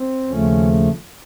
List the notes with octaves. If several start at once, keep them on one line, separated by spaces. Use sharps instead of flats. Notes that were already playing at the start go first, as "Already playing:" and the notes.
Already playing: C4
D#2 C#3 F3 A3 C#4